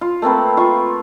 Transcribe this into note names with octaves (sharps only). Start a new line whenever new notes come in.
F4
A3 A#3 C4 B4
F4 C#6